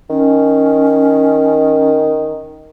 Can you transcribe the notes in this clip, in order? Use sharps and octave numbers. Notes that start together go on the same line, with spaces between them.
D#3 C#4